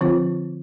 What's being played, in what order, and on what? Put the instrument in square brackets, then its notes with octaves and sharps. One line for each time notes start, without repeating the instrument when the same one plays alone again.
[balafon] D3 F3 C4 F4